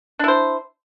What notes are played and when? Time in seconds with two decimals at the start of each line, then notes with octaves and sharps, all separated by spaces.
0.19 D4
0.24 E4
0.28 C5